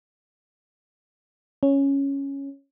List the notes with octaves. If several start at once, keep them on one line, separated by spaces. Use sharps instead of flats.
C#4